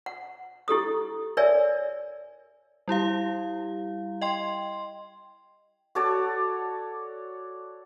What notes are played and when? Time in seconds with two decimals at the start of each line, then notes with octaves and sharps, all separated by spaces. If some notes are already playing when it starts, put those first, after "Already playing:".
0.06 F#5
0.68 E4 G4 A4 D#6
1.37 A#4 C#5 D5 E5 G#5
2.88 G3 E4 G4 F5
4.21 D#5 G5 C6
5.95 F#4 A4 C#5 D5